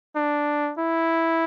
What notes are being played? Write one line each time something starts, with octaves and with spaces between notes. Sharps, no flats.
D4
E4